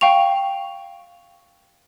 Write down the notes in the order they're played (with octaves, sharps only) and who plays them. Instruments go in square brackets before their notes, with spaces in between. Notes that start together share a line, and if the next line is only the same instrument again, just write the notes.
[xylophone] F5 G5 C#6 F7